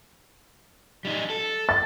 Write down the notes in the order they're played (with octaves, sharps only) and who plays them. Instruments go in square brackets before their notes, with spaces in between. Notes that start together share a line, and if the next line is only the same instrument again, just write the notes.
[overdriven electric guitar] G3 D#4
A4
[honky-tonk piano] A6